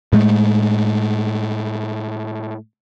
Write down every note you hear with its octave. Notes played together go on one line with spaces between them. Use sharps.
A2 G#3 A3